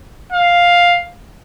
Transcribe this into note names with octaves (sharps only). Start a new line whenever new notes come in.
F5